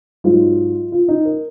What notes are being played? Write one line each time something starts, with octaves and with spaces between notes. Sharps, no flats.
G#2 F#3 F4
F4
D#4
A#4